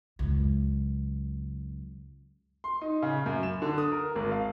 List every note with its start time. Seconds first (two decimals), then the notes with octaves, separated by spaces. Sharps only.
0.19 C#2 F#2
2.64 C6
2.81 D#4
3.02 C#3
3.26 F#2
3.43 E7
3.62 D3
3.78 D#6
3.92 A#4
4.16 G#1
4.32 F5